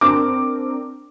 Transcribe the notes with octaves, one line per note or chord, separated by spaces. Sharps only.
C4 D4 A#4 D6